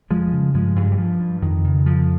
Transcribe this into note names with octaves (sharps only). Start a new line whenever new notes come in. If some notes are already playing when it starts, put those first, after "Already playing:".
F2 F3 G#3
C#3
G2 F3 G#3
G2
G3
G2 F3
G2
F2 D#3
C#3
F2 F3